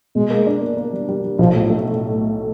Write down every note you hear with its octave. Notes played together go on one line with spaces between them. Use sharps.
B2 G#3
A#3
D4
A#3
A#3
G3
G3
G3
B1 F3
A2
A3